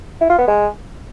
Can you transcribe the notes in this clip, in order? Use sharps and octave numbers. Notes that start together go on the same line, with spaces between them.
E4
F4
B3
G#3